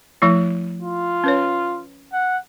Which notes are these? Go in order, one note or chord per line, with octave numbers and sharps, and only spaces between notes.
F3 A3 E4
F4
C#4 B4 C#5
F#5